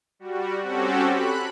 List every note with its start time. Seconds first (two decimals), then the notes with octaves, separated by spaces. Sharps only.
0.19 G3 F#4
0.62 C4 C#4 F#4 G4 A4
1.08 B5 F#6